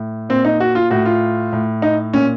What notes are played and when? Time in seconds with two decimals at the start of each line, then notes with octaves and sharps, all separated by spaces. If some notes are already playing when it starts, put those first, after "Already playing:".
Already playing: A2
0.29 A#2 C4
0.45 D#4
0.60 F#4
0.75 F4
0.91 A2 F#4
1.06 F4
1.53 A2
1.82 D#4
2.14 A#2 C#4